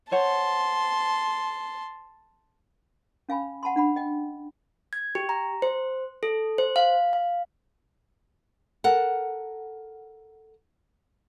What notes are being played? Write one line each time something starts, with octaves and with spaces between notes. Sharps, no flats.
C5 C#5 F#5 A5 C6
C#4 F5 G#5 B5
F#5 A5 B5 C6
D4 F#5 B5
D#5 G5
G#6
G4
A#5
C5
A4
C5
F5
F5
A4 A#4 F#5